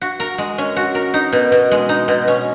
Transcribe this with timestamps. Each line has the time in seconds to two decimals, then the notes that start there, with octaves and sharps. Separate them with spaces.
0.01 F#4
0.20 A#4
0.38 G#3
0.58 C#4
0.76 F#4
0.95 A#4
1.14 D#4
1.33 B2
1.52 B2
1.71 G#3
1.89 D#4
2.08 B2
2.28 C#4